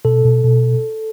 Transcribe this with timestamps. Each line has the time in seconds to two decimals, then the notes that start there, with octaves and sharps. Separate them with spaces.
0.05 B2 A4
0.25 B2
0.44 B2